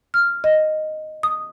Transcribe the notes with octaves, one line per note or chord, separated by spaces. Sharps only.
F6
D#5
D#6